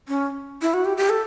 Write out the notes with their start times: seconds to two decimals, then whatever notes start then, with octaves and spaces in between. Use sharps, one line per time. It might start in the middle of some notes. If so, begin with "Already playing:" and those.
0.08 C#4
0.62 E4
0.74 F#4
0.85 G4
0.97 G4
1.10 A4